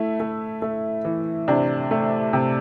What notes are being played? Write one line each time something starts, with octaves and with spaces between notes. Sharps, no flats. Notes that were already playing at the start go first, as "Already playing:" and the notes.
Already playing: A3 E4
A3
A3
E3
C3 D4
A3
C3